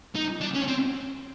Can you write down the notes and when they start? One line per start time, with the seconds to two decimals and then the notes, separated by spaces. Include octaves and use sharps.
0.16 D#4
0.41 D4
0.54 C#4
0.68 C4